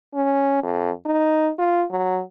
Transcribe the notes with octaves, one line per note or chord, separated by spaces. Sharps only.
C#4
F2
D#4
F4
F#3